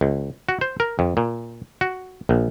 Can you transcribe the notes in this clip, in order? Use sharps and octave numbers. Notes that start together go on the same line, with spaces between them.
C#2
F#4
C5
A#4
F2
A#2
F#4
A#1